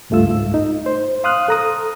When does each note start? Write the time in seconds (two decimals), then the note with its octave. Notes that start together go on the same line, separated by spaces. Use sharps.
0.10 C#2 G2 A3 F4 E6
0.28 G#2
0.54 D#4
0.86 C5
1.24 F5 C6 D#6 F6 F#6
1.48 A4 A#5 D#6